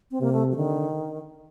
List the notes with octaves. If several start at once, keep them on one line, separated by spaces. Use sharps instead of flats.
C4
C3 A#3
A3
F#3
D3 D#3